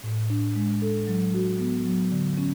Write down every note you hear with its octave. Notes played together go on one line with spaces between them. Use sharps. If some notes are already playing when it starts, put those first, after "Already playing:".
A2
D4
G#3
A4
F#3
F#4
B3
F#3
D3
C#4